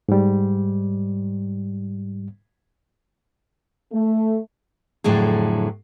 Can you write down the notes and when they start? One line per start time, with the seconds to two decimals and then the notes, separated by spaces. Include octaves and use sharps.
0.09 G#2 G3
3.92 A3
5.04 F2 A2 D3 F#3 G#4